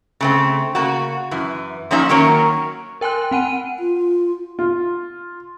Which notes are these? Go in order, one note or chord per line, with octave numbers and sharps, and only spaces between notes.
C#3 A3 C4
C#3 A#3 F#4
F#2 E3
F3 F#3 A#3 C#4 D#4 E5
D#3 F#3 A#3 C#4 A#4 C#5
A#4 G5 G#5 C6 F#6
C4 F#5 G#5 D#7
F4
F4